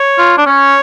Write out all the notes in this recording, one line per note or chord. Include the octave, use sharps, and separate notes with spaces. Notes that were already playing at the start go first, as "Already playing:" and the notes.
Already playing: C#5
F4
D4
C#4 C#5